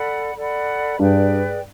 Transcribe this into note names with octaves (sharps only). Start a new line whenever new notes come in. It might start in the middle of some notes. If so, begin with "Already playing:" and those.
Already playing: A4 D5 F#5 B5
A4 D5 F#5 B5
G2 G#4 B4 D5 G5